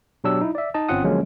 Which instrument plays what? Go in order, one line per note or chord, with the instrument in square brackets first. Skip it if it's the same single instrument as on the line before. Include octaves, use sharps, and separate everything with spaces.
[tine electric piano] B2 F#3 D4 G4 E6
D#4 E4
D5 E5
D#4 D#5 A5
G1 C4 C#4 F4 F#5 D#6
D3 F3 F#3 G#3 A#3 C#4